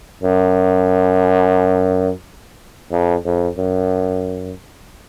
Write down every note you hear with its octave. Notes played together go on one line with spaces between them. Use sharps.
F#2
F2
F2
F#2